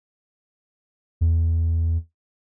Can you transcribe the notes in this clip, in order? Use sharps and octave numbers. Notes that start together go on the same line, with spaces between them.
E2